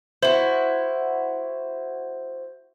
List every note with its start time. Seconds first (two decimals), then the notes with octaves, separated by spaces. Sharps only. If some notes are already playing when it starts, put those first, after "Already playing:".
0.23 E4 F#4 C5